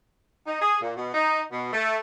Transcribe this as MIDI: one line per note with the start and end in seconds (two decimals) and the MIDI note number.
0.46 0.61 63
0.61 0.78 68
0.82 0.94 46
0.96 1.12 47
1.14 1.40 63
1.51 1.69 47
1.73 1.97 57